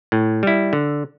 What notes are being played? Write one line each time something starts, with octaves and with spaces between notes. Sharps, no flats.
A2
G3 E4
D3